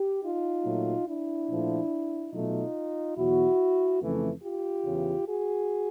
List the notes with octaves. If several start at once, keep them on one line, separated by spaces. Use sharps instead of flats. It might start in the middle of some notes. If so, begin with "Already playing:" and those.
Already playing: G4
D#4 F4
A#2 F#3 A3
D4 E4
A#2 F3 A3
B2 F#3 A3 D#4 F4
E2 B2 F#3 E4 F#4
F2 C#3 E3 A3
F4 G4
E2 C#3 E3
F#4 G#4